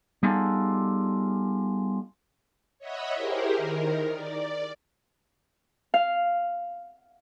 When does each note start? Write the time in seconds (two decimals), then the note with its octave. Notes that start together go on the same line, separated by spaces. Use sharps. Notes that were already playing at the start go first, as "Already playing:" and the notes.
0.23 G3 B3 D#4 F4 G#4 A4
2.79 C#5 D#5 E5 F#5 B5
3.15 E4 G4 G#4 A#4 C5
3.57 D#3 A#4
4.12 D5
5.94 F5